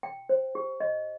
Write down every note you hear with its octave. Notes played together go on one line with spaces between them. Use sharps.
G5
C5
G4
D#5